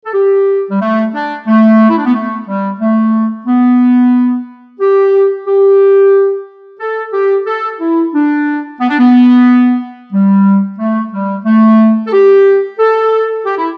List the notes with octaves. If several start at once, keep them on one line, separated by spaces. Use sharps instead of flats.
A4
G4
G3
A3
D4
A3
E4
D4
B3
A3
G3
A3
B3
G4
G4
A4
G4
A4
E4
D4
B3
D4
B3
G3
A3
G3
A3
A4
G4
A4
G4
E4